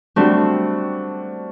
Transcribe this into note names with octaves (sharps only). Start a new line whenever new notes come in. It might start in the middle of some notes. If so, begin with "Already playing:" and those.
G3 A3 C4 D4 F#4